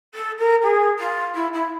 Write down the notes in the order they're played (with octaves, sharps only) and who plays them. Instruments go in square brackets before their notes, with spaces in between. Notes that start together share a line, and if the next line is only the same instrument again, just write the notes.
[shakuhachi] A4
A#4
G#4
F4
E4
E4